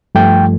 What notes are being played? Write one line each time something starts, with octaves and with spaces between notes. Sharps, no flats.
G2 F3 A3 G5